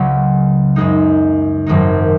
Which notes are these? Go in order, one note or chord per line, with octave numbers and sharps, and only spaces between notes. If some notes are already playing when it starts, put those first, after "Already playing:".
Already playing: C#2 C#3 F#3 C#4
F#2 C#3 G#3 D#4
G#1 F#2 D#3 G#3 D#4